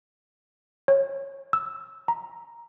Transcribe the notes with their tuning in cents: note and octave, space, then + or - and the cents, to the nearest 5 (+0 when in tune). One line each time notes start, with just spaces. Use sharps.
C#5 -15
E6 -5
A#5 +5